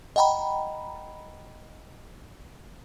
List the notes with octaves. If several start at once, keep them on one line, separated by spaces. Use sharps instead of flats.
D#5 F#5 G5 A#5 B5